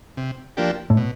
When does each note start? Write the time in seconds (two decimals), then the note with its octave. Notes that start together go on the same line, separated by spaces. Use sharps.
0.17 C3
0.57 F3 A#3 D4 G4
0.90 A2
0.97 B2